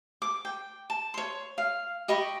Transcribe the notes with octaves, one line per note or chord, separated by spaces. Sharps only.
D6
G5
A5
C#5 C6
F5
G4 D#5 B5 C#6